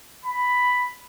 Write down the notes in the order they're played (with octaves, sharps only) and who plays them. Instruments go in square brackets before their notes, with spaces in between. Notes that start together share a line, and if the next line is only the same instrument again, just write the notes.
[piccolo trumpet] B5